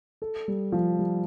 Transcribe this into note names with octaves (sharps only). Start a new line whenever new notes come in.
A4
G3
F3
G3